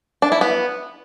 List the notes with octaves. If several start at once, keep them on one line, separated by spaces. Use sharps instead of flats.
D4
E4
B3